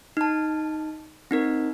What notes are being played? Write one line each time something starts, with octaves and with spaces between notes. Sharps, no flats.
D#4 A5
C4 D#4 A#4